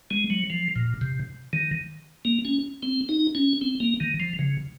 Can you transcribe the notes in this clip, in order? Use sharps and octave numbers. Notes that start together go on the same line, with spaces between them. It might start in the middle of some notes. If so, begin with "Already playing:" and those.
G#3
F#3
F3
A#2
C3
D#3
A#3
C#4
C4
D#4
C#4
C4
A#3
D#3
F3
C#3